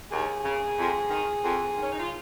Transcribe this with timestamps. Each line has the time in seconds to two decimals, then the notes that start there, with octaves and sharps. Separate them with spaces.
0.10 D#2 G#4
0.43 C#3
0.77 F2
1.09 D#3
1.42 F2
1.76 D#3
1.82 C#4
1.91 D#4
1.99 F4